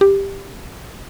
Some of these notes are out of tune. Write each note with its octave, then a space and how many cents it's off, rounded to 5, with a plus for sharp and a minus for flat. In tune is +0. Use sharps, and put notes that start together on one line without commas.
G4 +5